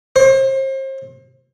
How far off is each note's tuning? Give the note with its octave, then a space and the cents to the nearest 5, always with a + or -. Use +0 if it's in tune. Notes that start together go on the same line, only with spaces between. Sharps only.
C5 +35